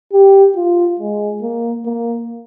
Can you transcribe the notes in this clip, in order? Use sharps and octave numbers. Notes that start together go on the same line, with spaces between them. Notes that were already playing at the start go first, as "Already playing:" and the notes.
G4
F4
G#3
A#3
A#3